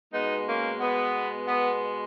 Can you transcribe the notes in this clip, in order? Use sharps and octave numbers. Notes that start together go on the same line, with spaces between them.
B2 G#3 B3 D#4
A#3 C#4
B3
B3